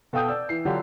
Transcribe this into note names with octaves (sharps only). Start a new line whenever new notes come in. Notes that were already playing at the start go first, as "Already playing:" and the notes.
B2 A4 F5 G5 D#6 G6
D5 E6
E3 C7
D3 F#3 D4 F4 G4